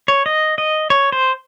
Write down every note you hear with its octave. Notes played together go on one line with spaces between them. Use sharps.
C#5
D#5
D#5
C#5
C5